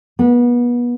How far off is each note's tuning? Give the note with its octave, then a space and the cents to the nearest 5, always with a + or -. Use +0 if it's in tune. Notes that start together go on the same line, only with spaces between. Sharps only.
B3 -30